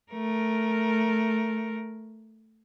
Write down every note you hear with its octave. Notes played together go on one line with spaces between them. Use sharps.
A3 A#4